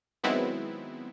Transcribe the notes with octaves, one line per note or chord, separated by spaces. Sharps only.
D#3 F#3 G#3 B3 C4 E4